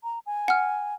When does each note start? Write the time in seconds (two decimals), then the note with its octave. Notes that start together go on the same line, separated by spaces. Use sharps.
0.04 A#5
0.26 G#5
0.48 F#5 F6